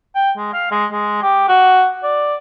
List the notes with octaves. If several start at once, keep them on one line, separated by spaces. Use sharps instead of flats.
G5
G#3
F5
G#3
G#3
G4
F#4
D5